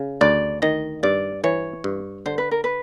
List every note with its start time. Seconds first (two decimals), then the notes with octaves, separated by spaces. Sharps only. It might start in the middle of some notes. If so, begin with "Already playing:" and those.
Already playing: C#3
0.21 D2 D5
0.62 D#3 D#5
1.03 G2 D5
1.44 E3 C#5
1.84 G2
2.26 D3 C5
2.38 B4
2.51 A#4
2.64 B4